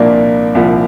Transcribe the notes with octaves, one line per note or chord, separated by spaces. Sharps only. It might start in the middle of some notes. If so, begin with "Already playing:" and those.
Already playing: C2 A#2 F3 A#3 D4
C2 A#2 F3